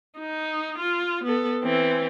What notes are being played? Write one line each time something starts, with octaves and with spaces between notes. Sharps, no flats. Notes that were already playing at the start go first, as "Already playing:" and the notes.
D#4
F4
B3 A4
E3 C4